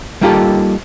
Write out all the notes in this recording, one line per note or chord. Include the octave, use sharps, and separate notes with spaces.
G3 A#3 D#4 F4 G4 A4